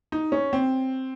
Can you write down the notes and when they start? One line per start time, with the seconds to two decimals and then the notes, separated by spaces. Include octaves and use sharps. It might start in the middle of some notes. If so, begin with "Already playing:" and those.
0.12 D#4
0.32 C#4
0.53 C4